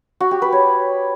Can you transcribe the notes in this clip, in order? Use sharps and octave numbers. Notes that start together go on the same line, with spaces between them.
F#4
G4
B4
C#5